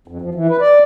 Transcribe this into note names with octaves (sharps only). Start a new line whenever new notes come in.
F2
F3
E3
B4
D5